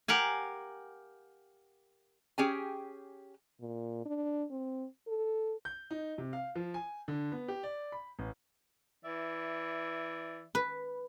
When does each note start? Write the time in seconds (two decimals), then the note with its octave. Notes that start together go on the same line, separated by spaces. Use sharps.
0.08 G4 A#4 F5 F#5 G#5
2.38 C#4 G4 G#4 G5 G#5
3.61 A#2
4.05 D4
4.50 C4
5.08 A4
5.65 G6
5.91 D#4
6.18 C3
6.33 F5
6.55 F3
6.74 G#5
7.08 D3
7.32 B3
7.48 G4
7.63 D5
7.92 B5
8.19 A1
9.04 E3 D5 E5
10.55 B4